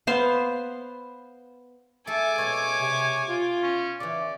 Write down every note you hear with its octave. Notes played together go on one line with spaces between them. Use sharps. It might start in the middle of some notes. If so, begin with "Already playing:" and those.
B3 C5 F5 C6
A3 G#4 A4 G#5 D6
B2 G#3 C#4 C#5
C3
F4
C#4
C#3 E3 D5